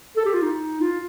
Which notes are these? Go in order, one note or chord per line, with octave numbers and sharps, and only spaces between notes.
A4
G4
F4
D#4
F4